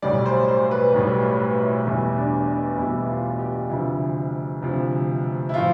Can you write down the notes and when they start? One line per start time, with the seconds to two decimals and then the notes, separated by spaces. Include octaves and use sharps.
0.02 B1 A2 G3 D5
0.26 C5
0.48 C5
0.63 C5
0.71 B4
0.94 B1 A2 G3 B4
1.40 B4
1.63 E4
1.86 E2 B2 G3 E4
2.17 D4
2.48 E4
2.78 E2 B2 G3 E4
3.09 F4
3.39 G4
3.69 D2 C3 F3 E4
4.62 D2 C3 F3
5.49 E4
5.54 A2 F3 F4